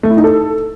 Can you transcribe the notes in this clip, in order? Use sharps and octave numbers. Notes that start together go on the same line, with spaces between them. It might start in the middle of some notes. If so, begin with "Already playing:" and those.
A3
E4
D#4
A4